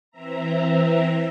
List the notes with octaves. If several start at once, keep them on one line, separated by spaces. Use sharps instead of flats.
E3 C4 E5 A#5